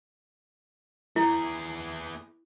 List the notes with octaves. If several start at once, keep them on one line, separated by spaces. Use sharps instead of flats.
B3 E4 G#4